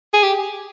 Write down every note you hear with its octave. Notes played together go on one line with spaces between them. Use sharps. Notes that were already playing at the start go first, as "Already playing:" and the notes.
G#4
G4